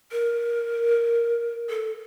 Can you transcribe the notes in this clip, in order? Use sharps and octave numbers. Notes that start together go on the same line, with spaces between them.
A#4
A4